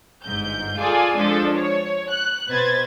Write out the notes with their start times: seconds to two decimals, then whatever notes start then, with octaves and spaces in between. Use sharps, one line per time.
0.25 G1 G#2 G6
0.78 F4 G#4 A4 D5 G#5
1.17 F3 G#3 D4 A4
1.56 C#5
2.10 F#6
2.50 B2 B4 C5 G#6 A6